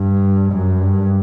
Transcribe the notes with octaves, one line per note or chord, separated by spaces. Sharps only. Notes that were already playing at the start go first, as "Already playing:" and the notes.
Already playing: G2
F#2
G2